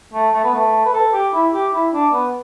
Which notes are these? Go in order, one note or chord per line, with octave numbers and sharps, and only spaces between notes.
A3
A3
B3
A3
B4
A4
G4
E4
G4
E4
D4
B3